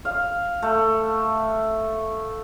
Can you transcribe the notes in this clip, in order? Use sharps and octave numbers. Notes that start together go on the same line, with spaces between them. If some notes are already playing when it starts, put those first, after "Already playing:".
F5
A3